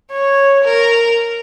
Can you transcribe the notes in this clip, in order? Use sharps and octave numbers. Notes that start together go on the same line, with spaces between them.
C#5
A#4